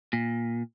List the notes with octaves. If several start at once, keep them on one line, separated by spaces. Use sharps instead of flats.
A#2